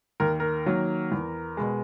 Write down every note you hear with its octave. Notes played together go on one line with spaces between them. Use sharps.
D#2 A#4
A#4
D#3 F#3 A#3
E2
B2 G#3